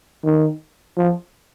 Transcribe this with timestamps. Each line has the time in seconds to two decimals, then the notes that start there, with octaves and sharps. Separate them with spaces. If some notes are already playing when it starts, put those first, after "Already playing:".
0.24 D#3
0.97 F3